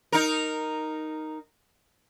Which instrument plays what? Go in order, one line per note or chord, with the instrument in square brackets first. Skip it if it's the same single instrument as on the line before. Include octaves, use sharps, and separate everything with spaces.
[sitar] D#4 A#4